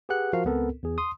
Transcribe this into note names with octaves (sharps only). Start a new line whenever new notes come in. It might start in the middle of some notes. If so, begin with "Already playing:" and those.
G4 G#4 B4 F#5 F#6
F3 F#4 A#4 F5
C#2 B3 C4 A4 A#4
E2 G#4
C6 D#6